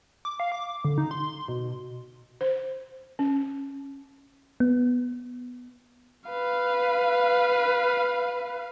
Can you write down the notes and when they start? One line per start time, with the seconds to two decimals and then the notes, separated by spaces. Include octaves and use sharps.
0.25 D6
0.40 F5
0.52 D6
0.84 D3
0.98 D#4
1.11 C6
1.48 B2
2.41 C5
3.19 C#4
4.60 B3
6.30 B4 F5